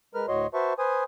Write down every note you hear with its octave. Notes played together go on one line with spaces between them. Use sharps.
G#3 A#4 B4 F6
D2 A2 F#4 C#5 D#5 C6
F#4 B4 C5 E5 A5 C#6
B4 C5 G#5 D#6